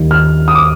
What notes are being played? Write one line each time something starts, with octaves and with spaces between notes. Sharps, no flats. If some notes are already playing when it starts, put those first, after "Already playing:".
Already playing: D#2 D#3 G3
F6
D#6
D6